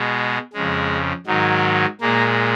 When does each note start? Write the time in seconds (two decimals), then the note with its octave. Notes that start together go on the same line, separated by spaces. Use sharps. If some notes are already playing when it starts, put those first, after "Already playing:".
Already playing: B2 G#3
0.53 F2 C#3 G#3
1.26 G#2 D#3 F#3
2.01 A#2 G#3 A#3